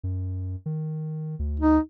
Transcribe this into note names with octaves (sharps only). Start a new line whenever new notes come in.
F#2
D#3
D2
D#4